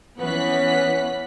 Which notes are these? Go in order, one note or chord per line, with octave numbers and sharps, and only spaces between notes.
E3 B3 C#4 F#6 B6